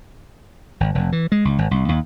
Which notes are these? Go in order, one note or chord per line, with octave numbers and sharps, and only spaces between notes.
G#1
F1
E3
G#3
C#2
G#1
C2
D#2